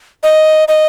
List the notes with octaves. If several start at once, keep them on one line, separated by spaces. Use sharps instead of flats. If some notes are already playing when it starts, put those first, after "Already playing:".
D#5
D#5